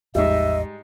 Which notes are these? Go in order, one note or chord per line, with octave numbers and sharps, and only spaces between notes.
A1 E2 G#2 F3 G3 D#5 E5